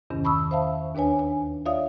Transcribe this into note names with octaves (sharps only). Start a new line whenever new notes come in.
E2 G2 C3 D#3 C#4
A5 B5 C#6 D#6 E6
C5 E5 F5 A5
D#2 D4 B4 C#5 G#5
G#5
F4 C#5 D5 E5 F5 D#6